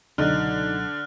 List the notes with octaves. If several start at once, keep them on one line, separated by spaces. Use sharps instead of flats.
C#2 B2 D3 F#3 D#4 F6 F#6